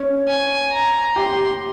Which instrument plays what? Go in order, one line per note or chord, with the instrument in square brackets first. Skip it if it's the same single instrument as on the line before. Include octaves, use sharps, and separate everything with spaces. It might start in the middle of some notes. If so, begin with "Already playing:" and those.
Already playing: [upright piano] C#4
[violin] G#5
A#5
[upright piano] G4 [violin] C6